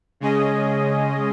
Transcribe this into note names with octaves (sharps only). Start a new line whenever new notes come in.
C#3 G#3 C#4 G#4 D#5